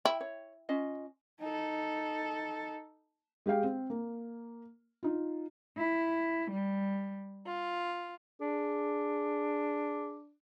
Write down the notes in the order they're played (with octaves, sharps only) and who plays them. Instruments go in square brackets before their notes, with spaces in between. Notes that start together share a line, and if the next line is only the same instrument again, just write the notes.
[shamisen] E4 [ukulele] G5
[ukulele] C#5
C#4 F4 D#5
[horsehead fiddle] D#4 A4
[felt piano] G#3 G4 G#4 F5 G5
C4
A#3
D#4 F4
[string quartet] E4
G3
F4
[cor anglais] D4 [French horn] G#4